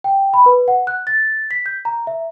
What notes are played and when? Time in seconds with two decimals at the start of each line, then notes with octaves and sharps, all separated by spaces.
0.04 G5
0.34 B5
0.46 B4
0.68 F#5
0.87 F#6
1.07 A6
1.51 B6
1.66 G6
1.85 A#5
2.07 E5